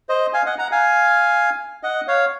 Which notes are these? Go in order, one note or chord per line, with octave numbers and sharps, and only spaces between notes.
C5 D#5
F5 G#5
D#5 F#5
F#5 A#5
F5 G#5
D#5 F#5
C#5 F5